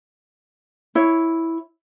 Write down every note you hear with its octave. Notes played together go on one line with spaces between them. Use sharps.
E4 C#5